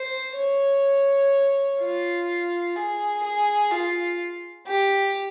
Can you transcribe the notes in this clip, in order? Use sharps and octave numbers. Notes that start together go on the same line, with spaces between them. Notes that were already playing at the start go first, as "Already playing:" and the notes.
Already playing: C5
C#5
F4
G#4
G#4
F4
G4